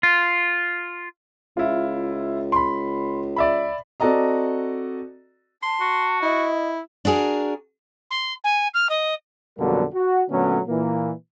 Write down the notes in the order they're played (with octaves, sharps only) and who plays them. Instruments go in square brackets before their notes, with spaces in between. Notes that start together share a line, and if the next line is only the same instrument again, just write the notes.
[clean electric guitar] F4
[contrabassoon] C#2 [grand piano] E4 F4
[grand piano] B5 C6
D5 E5 B5
C4 F#4 A4 D5 D#5 A#5
[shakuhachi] A5 [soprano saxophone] C6
[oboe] F#4
[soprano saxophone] E4 [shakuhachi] D#5
[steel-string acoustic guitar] D4 F#4 G#4 A#4
[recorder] C6
G#5
F6
D#5
[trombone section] F2 B2 D3 F#3 G3 A#3
F#4
A#2 D3 F#3 A3 B3 C#4
A#2 E3 A#3